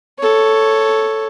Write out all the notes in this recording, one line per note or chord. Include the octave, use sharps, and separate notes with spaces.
A4 C#5